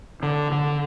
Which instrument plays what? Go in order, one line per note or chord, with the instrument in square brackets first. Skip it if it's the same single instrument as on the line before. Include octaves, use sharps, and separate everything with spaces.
[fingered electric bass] D3
D3